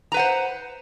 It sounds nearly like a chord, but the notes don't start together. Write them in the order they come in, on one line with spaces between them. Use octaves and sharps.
A#5 B4 F#5 C5